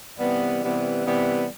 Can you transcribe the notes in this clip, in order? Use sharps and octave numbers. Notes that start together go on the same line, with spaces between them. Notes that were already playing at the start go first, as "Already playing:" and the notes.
C3 E3 G3 B3
C3 E3 G3 B3
C3 E3 G3 B3